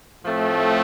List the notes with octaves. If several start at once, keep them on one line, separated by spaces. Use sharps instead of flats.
A2 F3 A3 C4